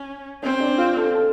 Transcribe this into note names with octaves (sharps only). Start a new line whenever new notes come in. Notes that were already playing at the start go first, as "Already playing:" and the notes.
Already playing: C#4
C4 C#4
D4
F4
A4
A4